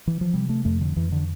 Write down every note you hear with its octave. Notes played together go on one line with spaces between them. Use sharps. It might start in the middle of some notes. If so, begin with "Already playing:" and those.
E3
F3
C3 G3
A3
F2 A3
D3
F2 E3
D3